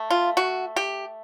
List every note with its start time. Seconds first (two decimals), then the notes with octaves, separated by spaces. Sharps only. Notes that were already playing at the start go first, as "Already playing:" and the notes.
Already playing: A3
0.10 F4
0.37 F#4
0.76 G4